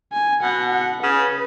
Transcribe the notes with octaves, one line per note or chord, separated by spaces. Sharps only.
G#5
B2 F#5
F#5
C#3 B4